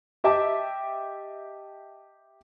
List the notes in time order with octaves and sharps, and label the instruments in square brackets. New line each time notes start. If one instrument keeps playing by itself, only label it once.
[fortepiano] G4 D#5 E5 G5 A5 D6